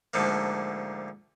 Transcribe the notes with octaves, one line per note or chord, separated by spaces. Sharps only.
D2 G#2 D3 F3 A#3